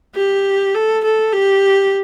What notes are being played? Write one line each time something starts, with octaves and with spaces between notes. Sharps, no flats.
G4
A4
A4
G4